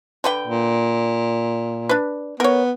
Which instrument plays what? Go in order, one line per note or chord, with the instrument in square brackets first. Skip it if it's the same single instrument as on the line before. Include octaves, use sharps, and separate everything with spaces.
[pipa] D3 B4 G5
[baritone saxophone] A#2
[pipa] D4 B4
[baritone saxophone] B3 [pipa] A#4 C#5